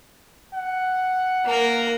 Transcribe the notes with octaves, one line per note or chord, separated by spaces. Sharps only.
F#5
A#3 A#4